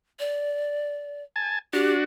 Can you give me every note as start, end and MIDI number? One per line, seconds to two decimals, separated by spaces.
0.19 1.22 74
1.36 1.59 80
1.36 1.59 81
1.73 2.04 62
1.73 2.04 66
1.73 1.93 67